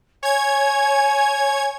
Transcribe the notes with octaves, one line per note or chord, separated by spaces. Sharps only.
C#5 G#5 G#6